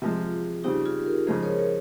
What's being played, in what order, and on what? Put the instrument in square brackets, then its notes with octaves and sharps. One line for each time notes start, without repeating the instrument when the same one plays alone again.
[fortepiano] C3 F3 G#3 [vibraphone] F4
[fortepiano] C#3 G3 C4 [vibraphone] D#4 G4
[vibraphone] F4 G#4
G4 A#4
[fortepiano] C#3 F3 G#3 D#4 [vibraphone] G#4 C5
[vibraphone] A#4 C#5
A#4 C#5